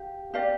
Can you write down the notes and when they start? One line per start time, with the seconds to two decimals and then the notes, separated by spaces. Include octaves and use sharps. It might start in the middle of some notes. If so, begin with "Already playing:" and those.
Already playing: G4 F5
0.34 G4 D5 F5